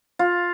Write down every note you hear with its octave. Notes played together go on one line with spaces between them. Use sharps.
F4